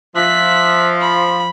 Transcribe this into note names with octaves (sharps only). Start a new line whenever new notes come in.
F3 E5 F#6 B6
B5